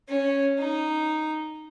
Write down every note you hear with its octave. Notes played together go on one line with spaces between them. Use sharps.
C#4
D#4